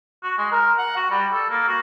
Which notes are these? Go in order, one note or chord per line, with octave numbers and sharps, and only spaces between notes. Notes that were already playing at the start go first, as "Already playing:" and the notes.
F#4
G#3
A#4
F#5
F#4
G3
A4
A#3
F#4